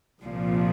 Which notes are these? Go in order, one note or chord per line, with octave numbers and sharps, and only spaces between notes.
C2 A#2 F3